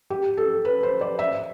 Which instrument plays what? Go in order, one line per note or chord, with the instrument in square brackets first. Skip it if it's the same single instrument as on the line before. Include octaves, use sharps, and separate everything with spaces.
[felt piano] G4
A4
B4
C5
D5
E5